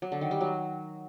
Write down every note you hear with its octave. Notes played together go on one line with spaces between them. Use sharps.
F#3
D3
D#3
G3
F#3